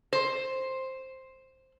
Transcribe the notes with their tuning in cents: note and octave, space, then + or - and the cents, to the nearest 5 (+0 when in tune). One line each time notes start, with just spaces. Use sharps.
C5 +5